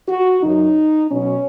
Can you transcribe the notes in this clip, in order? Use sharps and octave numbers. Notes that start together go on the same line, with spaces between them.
F#4
F#2 C#3 F#3 D#4
B2 F#3 C#4